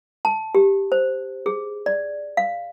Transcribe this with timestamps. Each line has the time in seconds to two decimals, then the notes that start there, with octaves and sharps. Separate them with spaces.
0.25 A5
0.55 G4
0.92 C5
1.46 G#4
1.86 D5
2.37 F5